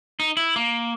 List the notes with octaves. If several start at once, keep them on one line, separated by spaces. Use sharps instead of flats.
D#4
E4
A#3